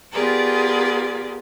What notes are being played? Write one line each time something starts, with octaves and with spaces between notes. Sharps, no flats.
B3 F4 G4 G#4 A#4 D5